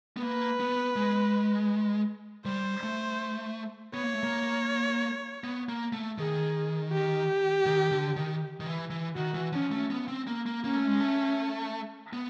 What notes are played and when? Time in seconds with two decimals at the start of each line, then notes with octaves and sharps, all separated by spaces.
0.17 B3
0.22 A#3 B4
0.60 B3
0.96 G#3
2.45 G3 C5
2.83 A3
3.94 B3 C#5
4.04 A#3
4.14 A3
4.23 A#3
5.44 B3
5.69 A#3
5.93 A3
6.17 D#3 G#4
6.92 G4
7.66 D#3
7.92 D3
8.16 D#3
8.60 D#3
8.66 E3
8.91 E3
9.15 D#3 F#4
9.35 E3
9.53 F3 C#4
9.72 A3
9.90 B3
10.08 C4
10.27 A#3
10.46 A#3
10.64 A#3 C#4
10.76 A3
10.87 G#3
11.00 A3
12.13 B3